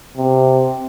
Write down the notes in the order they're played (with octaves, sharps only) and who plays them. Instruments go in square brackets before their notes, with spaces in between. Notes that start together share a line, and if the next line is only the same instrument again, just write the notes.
[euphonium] C3